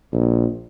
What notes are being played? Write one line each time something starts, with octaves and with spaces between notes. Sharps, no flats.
A#1